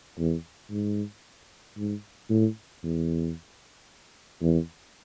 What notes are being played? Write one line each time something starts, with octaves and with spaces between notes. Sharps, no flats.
E2
G#2
G#2
A2
E2
E2